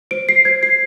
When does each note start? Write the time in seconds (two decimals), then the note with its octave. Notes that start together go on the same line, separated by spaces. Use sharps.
0.11 C5 D7
0.29 C7
0.45 C5 G#6
0.63 C7